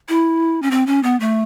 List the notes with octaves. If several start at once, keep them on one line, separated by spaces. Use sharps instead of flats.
E4
C#4
C4
C#4
B3
A3